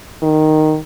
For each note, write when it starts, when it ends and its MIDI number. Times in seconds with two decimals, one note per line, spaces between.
0.23 0.77 51